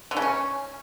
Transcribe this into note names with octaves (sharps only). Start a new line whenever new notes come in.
D3
C#3
C#4